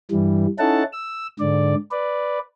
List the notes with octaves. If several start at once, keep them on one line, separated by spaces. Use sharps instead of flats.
G2 E3 G3
C#4 D#4 E4 A4 F#5 A5
E6
G#2 D3 D5
B4 D5